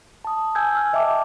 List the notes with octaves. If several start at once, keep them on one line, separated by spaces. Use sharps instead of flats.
A5 D#6
G#5 E6 G6 G#6
E6 F6
D#5 E5 G5 A5 D6